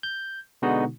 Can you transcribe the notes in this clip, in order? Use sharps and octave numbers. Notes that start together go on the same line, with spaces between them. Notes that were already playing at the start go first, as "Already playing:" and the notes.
G6
B2 D3 G#3 B3 D#4 F#4